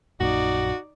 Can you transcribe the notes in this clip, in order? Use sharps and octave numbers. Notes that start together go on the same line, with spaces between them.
A#1 F#2 A#2 D#4 F#4 D5